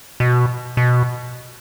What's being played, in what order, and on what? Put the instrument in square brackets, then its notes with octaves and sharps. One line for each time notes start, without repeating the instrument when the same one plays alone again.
[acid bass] B2
B2